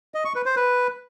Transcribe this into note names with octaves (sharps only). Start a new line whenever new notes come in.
D#5
C#6
B4
C5
B4